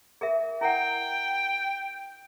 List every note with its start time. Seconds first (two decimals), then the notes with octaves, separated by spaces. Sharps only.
0.21 G#4 A#4 E5
0.61 E4 A#4 F#5 G5